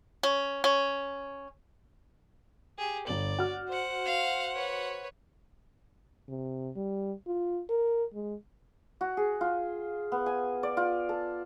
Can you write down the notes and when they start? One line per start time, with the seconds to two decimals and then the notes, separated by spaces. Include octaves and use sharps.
0.23 C#4
0.64 C#4
2.78 G4 G#4
3.07 G1 D5 F#7
3.39 F#4 F6
3.69 C5 F#5
4.05 F5
4.55 B4 C#5
6.28 C3
6.76 G3
7.27 F4
7.69 A#4
8.14 G#3
9.01 F#4
9.17 G#4
9.41 F4
10.12 B3
10.26 G#5
10.63 D5
10.77 F4
11.09 A4